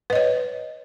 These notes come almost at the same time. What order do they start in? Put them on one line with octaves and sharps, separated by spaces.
B4 D#5 C#5